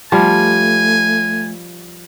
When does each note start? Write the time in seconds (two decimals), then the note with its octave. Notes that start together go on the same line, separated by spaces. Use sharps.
0.12 F3 G3 A3 G#5